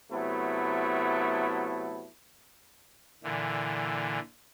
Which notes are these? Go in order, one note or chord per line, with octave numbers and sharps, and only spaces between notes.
C3 F#3 A3 B3 E4
A#2 D3 E3